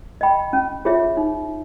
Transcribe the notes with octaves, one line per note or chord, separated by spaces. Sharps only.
D#5 G5 B5
C#4
F4 G#4 C#5 E5
D#4